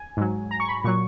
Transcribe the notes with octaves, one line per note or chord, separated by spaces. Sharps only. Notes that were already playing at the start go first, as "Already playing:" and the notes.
Already playing: G#5
G#2 F#3
A#5
C#6
B5
A#2 F#3 C#6